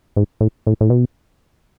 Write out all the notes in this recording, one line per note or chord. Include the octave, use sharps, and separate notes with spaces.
G#2
A2
A2
A2
B2